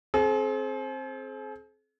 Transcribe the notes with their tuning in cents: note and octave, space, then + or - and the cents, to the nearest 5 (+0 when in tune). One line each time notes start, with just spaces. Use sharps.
C4 +15 G#4 +45